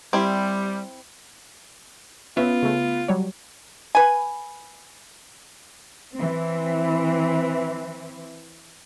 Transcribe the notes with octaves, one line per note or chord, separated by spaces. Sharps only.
G3 C4 E4
B3 C#4 F4 E5
C#3 A3
F#3 G3 C#5
B4 G#5
E3 C4